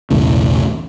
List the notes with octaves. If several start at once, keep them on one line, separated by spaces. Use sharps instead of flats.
B1 E2 A2 C#3